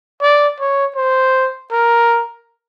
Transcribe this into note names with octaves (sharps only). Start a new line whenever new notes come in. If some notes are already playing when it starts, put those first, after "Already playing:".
D5
C#5
C5
A#4